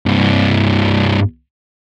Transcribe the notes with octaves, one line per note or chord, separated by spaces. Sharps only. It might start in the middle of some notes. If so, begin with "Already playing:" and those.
C2 G2